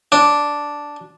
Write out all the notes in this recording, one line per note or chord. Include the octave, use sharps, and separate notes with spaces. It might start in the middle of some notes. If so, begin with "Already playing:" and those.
D4